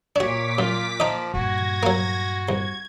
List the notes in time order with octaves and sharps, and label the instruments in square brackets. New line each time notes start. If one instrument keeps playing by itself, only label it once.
[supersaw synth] A#2 D6 B6 [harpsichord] D4 F#4 [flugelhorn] C#5
[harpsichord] F#2 [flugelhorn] F4
[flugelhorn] F3 [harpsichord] D#4 D#5
[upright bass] G2 A#2 [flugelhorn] F#4 [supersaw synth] G#6 A#6
[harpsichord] F#3 A#3
[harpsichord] C2 [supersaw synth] G#6